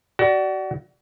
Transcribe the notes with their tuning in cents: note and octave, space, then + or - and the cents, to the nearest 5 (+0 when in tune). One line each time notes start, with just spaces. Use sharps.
F#4 +30 D5 +0